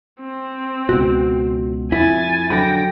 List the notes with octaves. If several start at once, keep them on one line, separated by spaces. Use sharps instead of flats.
C4
C#2 B2 F#4
F2 E4 G#5 A6
D3 F#3 F#5 G5 B5 A#6